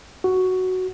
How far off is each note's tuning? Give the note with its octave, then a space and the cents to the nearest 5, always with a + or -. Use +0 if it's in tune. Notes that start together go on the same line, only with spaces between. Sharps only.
F#4 +5